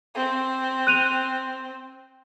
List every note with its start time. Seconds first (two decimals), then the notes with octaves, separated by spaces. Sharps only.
0.15 C4
0.87 F#6 D#7 F7